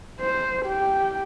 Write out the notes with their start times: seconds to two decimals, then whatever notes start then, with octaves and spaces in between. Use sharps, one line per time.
0.21 C5
0.65 G4 G5